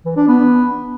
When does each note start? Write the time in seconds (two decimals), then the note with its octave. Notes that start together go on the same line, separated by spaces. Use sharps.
0.05 E3
0.17 D4
0.28 B3